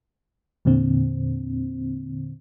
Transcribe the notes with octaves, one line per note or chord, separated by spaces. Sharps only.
E2 A#2 D3 C4